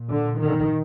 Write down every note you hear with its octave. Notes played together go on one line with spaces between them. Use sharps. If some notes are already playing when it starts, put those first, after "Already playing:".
Already playing: A#2
D3
D#3